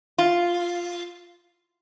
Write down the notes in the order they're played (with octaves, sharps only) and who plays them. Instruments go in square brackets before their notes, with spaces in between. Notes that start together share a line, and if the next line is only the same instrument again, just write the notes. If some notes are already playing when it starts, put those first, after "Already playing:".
[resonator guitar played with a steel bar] F4